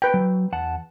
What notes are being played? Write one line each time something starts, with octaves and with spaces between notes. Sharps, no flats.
B4 G5
F#3
E2 F#5 A5